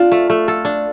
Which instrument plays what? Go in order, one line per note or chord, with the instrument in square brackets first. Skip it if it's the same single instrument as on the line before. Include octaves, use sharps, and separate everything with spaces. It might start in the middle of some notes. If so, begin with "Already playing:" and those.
Already playing: [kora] D4 [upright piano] F4
[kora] A3
A3
A4
D4